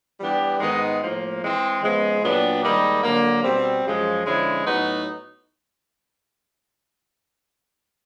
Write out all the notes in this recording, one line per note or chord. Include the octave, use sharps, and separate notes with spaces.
E3 G3 B3 D4 G4
G#2 D#3 G#3 B3 D#4
A2 F3 A#3
E3 G#3 C4
C#3 F3 G#3 B3
A#2 F#3 B3 D4 G4
G#2 D#3 G3 A#3 D#4
D3 F#3 A#3
B2 G3 C4
F#2 C#3 F3 G#3
D3 F3 G#3 C#4 E4
A2 F#3 B3 D#4 F#4